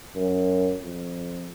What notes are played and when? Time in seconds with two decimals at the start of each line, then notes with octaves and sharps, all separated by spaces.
0.16 F#2
0.81 F2